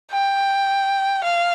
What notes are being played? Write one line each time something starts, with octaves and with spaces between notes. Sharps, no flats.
G5
F5